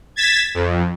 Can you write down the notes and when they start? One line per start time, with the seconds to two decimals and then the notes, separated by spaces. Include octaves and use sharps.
0.16 G#6 A6 B6 E7
0.54 F2